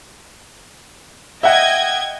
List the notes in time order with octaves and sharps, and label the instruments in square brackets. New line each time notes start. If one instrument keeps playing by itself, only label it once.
[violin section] D#5 G5 G#6 [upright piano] E5 F#5